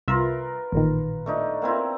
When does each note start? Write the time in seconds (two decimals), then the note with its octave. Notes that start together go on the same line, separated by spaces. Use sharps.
0.08 C2 F4 A#4 B4 E5
0.72 A1 A#2 D#3
1.26 A3 D4 D#4
1.62 A#3 C4 E4